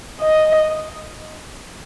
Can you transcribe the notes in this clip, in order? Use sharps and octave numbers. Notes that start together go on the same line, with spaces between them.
D#5